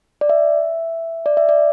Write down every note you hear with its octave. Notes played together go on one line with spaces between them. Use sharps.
D5
E5
D5
E5
D5